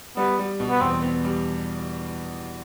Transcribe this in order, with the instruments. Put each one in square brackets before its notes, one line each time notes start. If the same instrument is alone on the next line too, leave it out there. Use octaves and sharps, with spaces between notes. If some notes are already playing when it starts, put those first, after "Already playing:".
[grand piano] G3 [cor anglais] B3
[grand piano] G3
B2
[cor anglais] B3
[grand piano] E2 [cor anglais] C4
[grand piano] B3
G3